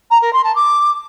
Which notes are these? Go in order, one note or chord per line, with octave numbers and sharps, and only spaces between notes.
A#5
A#4
C6
A5
D6